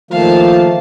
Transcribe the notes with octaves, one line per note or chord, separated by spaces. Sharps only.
D#3 F3 A3 A#3 F5 A5